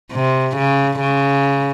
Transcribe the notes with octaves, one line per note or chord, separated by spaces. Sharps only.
C3
C#3
C#3